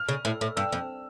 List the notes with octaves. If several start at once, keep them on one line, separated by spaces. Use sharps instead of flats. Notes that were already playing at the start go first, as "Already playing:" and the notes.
Already playing: F6
C#3
A2
A2
G2 E6
F2